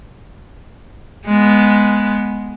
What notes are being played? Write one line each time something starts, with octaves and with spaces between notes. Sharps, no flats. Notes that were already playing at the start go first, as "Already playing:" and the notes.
G#3 B3